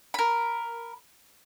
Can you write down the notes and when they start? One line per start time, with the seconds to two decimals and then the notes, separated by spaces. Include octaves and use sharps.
0.14 A#4 B5